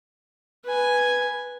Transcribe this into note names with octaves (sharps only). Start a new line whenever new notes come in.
B4 G#5